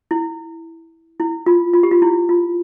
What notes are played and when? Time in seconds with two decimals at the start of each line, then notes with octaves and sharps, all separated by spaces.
0.11 E4
1.20 E4
1.46 F4
1.74 F4
1.83 G4
1.91 F4
2.02 E4
2.29 F4